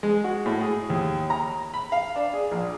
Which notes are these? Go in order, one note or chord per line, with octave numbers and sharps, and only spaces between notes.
G#3
F#4
A2
G#4
D#2
A#5
B5
F5
D4
G#4
A#1